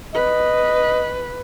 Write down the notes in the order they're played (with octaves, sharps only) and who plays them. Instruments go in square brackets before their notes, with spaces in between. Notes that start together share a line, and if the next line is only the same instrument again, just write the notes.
[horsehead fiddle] B4 [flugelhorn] D#5